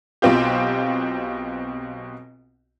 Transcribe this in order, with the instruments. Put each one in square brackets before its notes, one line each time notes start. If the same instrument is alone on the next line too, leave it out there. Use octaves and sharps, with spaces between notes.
[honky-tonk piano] B1 B2 C4 F4 G4